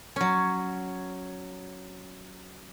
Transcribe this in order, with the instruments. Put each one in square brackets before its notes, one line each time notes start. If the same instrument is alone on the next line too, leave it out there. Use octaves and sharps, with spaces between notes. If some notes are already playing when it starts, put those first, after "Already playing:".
[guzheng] F#3 C#4